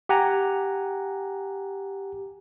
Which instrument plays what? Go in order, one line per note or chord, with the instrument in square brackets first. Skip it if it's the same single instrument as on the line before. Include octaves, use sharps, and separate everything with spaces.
[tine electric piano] G4 F#5 G#5 A#5